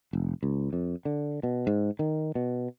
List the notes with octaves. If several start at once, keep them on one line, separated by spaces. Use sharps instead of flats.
F1
C#2
F2
D3
B2
G#2
D#3
B2